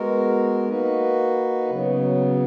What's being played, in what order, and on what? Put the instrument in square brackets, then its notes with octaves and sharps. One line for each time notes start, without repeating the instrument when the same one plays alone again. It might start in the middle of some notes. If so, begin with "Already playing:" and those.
Already playing: [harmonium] G#3 B3 F#4 A#4
A#3 D#4 F#4 B4
C#3 F#3 B3